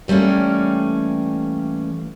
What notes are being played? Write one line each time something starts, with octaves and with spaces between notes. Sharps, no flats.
E3 G3 A3 A#3 C#4